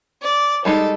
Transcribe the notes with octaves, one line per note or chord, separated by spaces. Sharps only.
D5
G3 G#3 D#4 A4